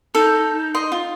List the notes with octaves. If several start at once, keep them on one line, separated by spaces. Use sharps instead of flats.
D#4 A4
D#5 C6
F4